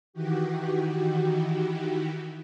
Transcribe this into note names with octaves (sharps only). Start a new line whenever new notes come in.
D#3 E3 F#4 G4